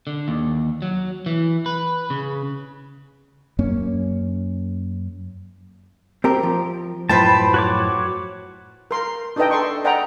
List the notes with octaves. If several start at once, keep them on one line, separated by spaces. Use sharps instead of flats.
D3
D#2
F#3
E3
B4
C#3
F#2 A#3 C#4
C4 G4 A#4
F3
F#2 A2 F3 B4 C5 G5 A5
F#4 C#5 D6
A#4 C6
D4 D#4 A4 B4 D#5 G5
A4 C6 C#6
D5 D#5 F#5 G5 A#5 B5